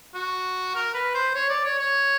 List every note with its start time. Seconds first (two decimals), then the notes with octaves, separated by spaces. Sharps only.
0.15 F#4
0.75 A#4
0.94 B4
1.14 C5
1.35 C#5
1.50 D5
1.65 C#5
1.79 C#5